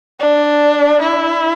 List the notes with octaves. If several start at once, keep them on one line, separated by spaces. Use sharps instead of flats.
D4
E4